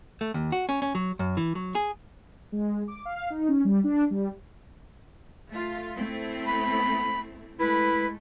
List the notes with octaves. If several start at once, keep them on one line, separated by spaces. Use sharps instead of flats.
A3
D#2
F#4
C#4
C#4
F#3
F#2
E3
F#3
G#4
G#3
D6
F5
D#4
C#4
G3
D4
G3
A3 F4
A3 C4 E4
B5
G#3 A3 E4 B4